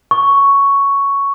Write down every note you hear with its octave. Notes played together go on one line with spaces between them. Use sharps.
C#6